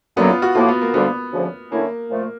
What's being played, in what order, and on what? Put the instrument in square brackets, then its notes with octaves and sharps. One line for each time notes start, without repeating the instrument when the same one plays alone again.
[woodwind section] F#2 D3 F#3 A#3 [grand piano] B3
[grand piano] F4
F#4
[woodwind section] A2 F3 A#3 [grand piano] F4
[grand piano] B3
A#3
[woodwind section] D2 D3 G3 A#3 [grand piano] B3
[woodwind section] D2 C#3 F3
[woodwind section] D3 F#3 A3 C#4 E4 [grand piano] A#3
[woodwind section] A#2 F3 A3